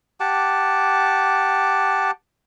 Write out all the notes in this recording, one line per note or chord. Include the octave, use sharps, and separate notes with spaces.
G4 F#5 A5 D6